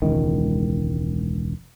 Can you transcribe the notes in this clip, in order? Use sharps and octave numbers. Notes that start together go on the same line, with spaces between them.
E1 C#2 D#3